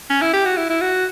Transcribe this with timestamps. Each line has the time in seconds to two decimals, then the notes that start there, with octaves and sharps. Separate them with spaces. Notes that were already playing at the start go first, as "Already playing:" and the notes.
0.10 C#4
0.21 E4
0.33 G4
0.45 F#4
0.57 E4
0.70 E4
0.81 F#4